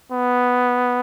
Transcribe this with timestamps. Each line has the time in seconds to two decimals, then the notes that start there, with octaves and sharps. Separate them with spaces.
0.12 B3